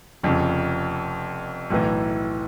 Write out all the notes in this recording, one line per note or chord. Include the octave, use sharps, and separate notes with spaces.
F1 F2 C#3
B1 A2 E3